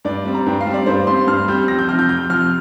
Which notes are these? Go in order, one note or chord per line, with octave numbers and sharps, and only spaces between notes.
G2 D5
G3 C4
A#5
G2 G5
F5
G3 C4
D5
G2 C5
G3 C4 C6
G2 F6
G3 C4 G6
F2 A#6
G6
C3 F3 F6
G6
F2 G6
C3 F3 F6